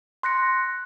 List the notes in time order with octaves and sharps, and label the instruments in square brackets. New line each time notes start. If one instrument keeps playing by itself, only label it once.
[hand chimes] C6 F#6 A#6 C#7